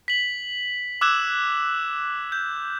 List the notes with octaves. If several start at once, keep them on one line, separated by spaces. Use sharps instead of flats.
B6 F#7
D6 E6 F#6 G#6 E7
G6